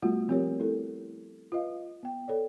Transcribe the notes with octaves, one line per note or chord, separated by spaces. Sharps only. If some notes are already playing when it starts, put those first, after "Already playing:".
G3 A3 B3 F4 F#4
F3 C4 F4 G4 A#4 C#5
A3 E4 A4
F4 B4 D#5 F5
B3 G5
A4 C#5 D5